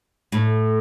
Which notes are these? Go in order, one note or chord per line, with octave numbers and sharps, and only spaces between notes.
A2